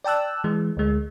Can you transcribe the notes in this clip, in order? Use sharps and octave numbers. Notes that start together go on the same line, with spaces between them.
D5 G5 A5 E6 F#6
E3 G#3
D2 G#3